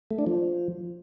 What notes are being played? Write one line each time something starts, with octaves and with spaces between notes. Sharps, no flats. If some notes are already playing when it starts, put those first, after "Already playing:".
A3
D4
F3